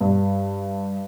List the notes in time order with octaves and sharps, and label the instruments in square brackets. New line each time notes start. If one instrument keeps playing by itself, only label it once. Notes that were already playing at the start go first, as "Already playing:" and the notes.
[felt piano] G2